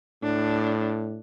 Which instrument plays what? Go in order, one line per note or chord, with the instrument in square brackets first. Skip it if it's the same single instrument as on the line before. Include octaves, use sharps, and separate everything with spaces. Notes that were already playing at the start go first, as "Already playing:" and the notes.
[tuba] A2 [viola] D4